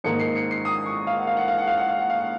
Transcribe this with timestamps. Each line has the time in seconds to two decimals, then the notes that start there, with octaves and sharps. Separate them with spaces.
0.04 G#2 D#3 A#3 D#4 C#7
0.20 C7
0.36 C#7
0.51 C7
0.65 D#6
0.86 C#6
1.07 F5
1.17 F#5
1.27 F5
1.37 F#5
1.48 F5
1.58 F#5
1.67 F5
1.78 F#5
1.88 F5
1.99 F#5
2.10 F5
2.19 F#5